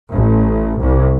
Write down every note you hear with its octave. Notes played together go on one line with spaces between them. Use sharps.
A1
C2